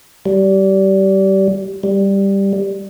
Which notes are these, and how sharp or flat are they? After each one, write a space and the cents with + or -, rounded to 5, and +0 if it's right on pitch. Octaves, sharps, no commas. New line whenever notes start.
G3 -25
G3 +5